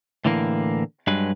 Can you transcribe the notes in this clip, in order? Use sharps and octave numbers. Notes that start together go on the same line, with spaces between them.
A2 D3 E3 A#3
G2 F#3 G#3 B4